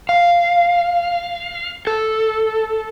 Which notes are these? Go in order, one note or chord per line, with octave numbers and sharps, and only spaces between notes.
F5
A4